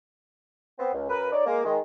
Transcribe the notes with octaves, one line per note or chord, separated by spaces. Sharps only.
B3 C4
C#2
F#2 A#4 B4
D#4 C#5 D5
G#3 A#3
D#3 G#3